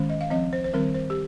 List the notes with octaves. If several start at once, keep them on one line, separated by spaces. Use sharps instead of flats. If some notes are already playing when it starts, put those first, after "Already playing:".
Already playing: D#3 G#3 C#4
D#5
F5
F3 C4 D#5
C5
C5
D#3 G3 C4 A#4
C5
G4